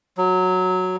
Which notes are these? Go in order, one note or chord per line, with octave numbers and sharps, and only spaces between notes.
F#3